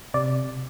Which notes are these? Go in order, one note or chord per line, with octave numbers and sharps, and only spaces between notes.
C3 D5